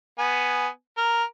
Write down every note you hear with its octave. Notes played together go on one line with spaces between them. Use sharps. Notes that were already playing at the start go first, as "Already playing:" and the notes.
B3 G#5
A#4